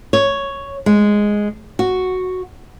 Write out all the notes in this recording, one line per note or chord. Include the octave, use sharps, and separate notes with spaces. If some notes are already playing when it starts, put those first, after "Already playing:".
C#5
G#3
F#4